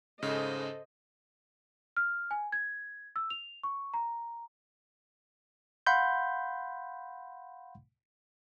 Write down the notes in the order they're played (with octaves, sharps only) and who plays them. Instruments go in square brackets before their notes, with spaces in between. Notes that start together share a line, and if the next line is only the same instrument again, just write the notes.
[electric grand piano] G#2 C#3 [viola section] A4 C5 D#5
[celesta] F6
G#5
G#6
E6
F7
C#6
A#5
[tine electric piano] F5 F#5 B5 C6 G6